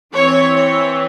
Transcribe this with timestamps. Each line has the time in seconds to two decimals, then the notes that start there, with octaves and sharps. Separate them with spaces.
0.13 E3 C4 C#5
0.55 C#5